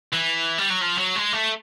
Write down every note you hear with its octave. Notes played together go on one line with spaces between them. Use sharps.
E3
G3
F#3
F3
F#3
G#3
A3